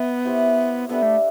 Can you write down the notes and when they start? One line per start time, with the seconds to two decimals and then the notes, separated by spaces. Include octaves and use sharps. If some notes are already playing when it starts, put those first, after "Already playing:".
Already playing: B3 E5
0.25 E4 G4 C5 E5
0.89 G3 B3 D4 A4 E5
1.02 A3